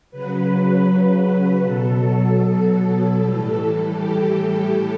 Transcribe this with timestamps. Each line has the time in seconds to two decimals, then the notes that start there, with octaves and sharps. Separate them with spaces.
0.11 C#3 F#3 B4
0.88 B4
1.64 B2 F#3 A4
3.17 A2 E3 G3
3.94 G4